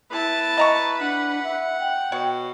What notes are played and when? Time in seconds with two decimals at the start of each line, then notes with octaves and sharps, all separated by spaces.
0.11 E4 B4 A5
0.58 D#5 A#5 C#6
1.00 D4 F#5
1.44 E5
1.80 G5
2.12 B2 C#5